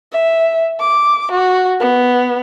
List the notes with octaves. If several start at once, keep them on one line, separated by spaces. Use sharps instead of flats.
E5
D6
F#4
B3